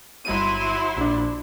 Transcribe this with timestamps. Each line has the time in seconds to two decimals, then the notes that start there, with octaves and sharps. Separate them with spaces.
0.25 G1 F#3 E4 C6 D#7
0.97 A#1 D4